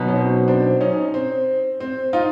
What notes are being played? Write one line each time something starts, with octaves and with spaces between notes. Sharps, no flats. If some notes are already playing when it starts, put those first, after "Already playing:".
Already playing: B2 F#3 B3 D#4
C#4
C4
C4 D4
C#4 D#4
C4
C4
D#4 F4